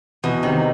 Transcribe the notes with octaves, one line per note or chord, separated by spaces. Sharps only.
E2 B2
C3 D#3